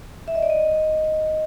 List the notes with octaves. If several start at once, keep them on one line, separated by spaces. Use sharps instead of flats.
E5
D#5
D5
D#5